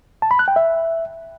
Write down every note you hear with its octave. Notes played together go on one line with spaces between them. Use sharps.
A5
B5
F#6
G5
E5